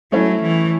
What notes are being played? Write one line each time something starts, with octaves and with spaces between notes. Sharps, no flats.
F#3 A3 C#4 E4
E3